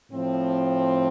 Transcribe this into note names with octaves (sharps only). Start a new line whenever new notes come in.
A2 F3 C4